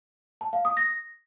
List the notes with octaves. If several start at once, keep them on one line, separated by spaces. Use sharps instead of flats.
A5
F5
D#6
A#6